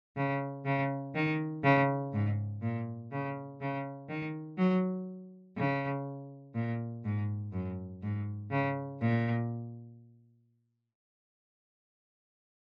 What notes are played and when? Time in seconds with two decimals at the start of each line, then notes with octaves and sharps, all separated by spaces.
0.17 C#3
0.65 C#3
1.15 D#3
1.64 C#3
2.13 G#2
2.62 A#2
3.12 C#3
3.61 C#3
4.09 D#3
4.58 F#3
5.57 C#3
6.55 A#2
7.04 G#2
7.52 F#2
8.03 G#2
8.51 C#3
9.01 A#2